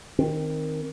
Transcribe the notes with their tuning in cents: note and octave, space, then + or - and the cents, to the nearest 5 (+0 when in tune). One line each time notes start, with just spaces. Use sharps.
D#3 +0 C4 +5